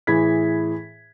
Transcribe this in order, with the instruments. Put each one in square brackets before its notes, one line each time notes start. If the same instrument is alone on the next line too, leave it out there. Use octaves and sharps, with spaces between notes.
[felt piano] A2 E3 G#4 B5 G#6 B6